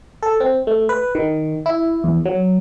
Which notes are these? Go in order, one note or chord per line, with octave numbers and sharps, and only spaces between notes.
A4
C4
A3
B4
D#3
E4
E2
F#3